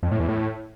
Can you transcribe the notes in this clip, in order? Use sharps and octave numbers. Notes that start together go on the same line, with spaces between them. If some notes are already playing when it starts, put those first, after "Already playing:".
F2
A2
E2
A2